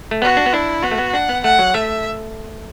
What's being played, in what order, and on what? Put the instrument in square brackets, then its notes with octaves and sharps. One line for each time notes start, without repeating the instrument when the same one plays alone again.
[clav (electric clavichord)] A3
[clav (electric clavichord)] B3 [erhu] F#4
[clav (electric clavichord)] D4
B3
[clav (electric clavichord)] D4 [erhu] E4
[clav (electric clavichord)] B3 [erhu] F#4
[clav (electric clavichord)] A3
B3
[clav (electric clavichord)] D4 [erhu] F#5
[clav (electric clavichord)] B3
[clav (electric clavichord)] A3 [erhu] F#5
[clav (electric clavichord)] F#3
[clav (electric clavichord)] A3 [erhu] E5